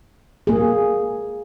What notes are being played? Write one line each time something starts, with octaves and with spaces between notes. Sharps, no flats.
A#3 G#4